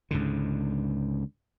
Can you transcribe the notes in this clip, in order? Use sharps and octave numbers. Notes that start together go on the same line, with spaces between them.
C#2 G#2 D3